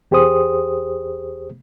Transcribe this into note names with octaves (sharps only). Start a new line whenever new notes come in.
E2 G4 G#4 C5 D#6